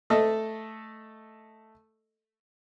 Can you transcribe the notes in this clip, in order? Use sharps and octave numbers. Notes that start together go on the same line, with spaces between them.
A3 A4 D#5